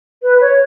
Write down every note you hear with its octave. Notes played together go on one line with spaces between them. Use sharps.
B4
C#5